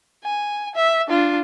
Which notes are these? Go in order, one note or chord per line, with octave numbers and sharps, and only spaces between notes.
G#5
E5
D4 F4